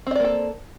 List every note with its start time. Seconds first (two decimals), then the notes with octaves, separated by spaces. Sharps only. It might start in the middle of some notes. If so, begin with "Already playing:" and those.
0.07 C4
0.11 D#5
0.15 D5
0.20 A#3
0.24 A4